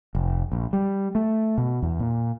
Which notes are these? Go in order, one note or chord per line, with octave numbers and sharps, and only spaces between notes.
F1
A#1
G3
A3
B2
E2
A#2